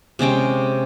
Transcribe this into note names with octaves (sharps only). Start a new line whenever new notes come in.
C3 G#3 C#4 G5